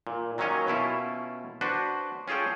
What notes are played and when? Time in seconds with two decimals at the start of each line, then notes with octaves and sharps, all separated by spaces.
0.07 A#2
0.38 D#3 F#3 A#3 C#4 C#5 D#5
0.67 B2 C#4 E4 F4
1.61 D4 F#4 B4 C5
2.28 C#4 F4 G#4 A4 G5